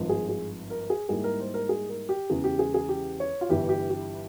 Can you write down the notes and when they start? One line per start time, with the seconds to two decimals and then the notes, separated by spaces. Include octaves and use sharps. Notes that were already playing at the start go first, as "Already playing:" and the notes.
Already playing: G#1 G2 F3
0.09 G#4
0.29 G#4
0.70 A#4
0.90 G#4
1.09 G#2 G3 A#3 E4 G#4
1.24 A#4
1.40 C5
1.54 A#4
1.69 G#4
1.89 A#4
2.09 G4
2.30 E2 C#3 E3 G#3 G#4
2.44 G4
2.59 G#4
2.74 G#4
2.89 G4
3.20 C#5
3.41 F4
3.49 G1 G2 E3 G4
3.69 G4
3.90 G4